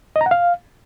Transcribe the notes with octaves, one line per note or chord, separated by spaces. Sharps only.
D#5
A#5
F#5
F5